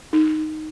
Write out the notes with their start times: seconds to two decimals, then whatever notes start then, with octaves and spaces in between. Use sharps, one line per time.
0.13 D#4